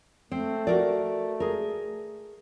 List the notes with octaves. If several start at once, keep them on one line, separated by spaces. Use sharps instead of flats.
A3 C4
F#4 A#4 D5
G#4 A#4